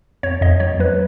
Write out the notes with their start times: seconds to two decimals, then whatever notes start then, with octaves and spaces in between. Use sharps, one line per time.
0.23 F2 C#5
0.41 F2 D#5
0.60 F#3 C#5
0.80 F#3 B4